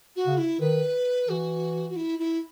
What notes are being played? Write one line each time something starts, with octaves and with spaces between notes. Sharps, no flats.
F#4
C#3
E4
D#3 B4
E3 F#4
F#4
E4
E4